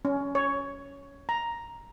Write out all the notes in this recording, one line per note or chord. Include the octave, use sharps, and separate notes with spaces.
C#4
C#5
A#5